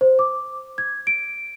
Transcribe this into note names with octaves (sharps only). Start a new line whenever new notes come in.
C5
D6
G#6
D7